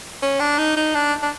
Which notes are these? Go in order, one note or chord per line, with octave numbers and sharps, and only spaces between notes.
C#4
D4
D#4
D#4
D4
D4